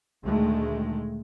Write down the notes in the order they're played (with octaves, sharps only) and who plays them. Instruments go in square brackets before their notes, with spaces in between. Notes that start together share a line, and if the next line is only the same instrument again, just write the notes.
[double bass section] D2 A#2 D#3 G#3 A3